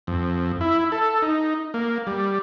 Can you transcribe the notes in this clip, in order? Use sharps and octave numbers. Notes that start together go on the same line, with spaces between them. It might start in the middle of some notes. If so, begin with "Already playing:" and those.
F2
E4
A4
D#4
A#3
G3